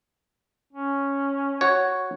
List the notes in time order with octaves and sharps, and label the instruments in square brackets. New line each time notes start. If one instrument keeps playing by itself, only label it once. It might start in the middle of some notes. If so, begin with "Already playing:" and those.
[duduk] C#4
[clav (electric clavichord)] F#4 C#5